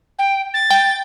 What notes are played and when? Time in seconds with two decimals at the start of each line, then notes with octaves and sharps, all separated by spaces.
0.18 G5
0.54 A6
0.70 G5